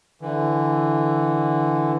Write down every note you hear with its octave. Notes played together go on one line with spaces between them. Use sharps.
D3 E3